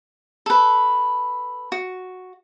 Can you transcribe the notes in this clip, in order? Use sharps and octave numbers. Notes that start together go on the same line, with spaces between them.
A4 B4
F#4